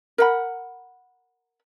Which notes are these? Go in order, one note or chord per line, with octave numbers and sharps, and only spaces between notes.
A#4 F#5 B5